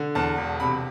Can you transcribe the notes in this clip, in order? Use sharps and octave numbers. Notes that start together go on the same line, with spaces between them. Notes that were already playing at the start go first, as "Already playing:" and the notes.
Already playing: D3
E2 A5
E1
C3 B5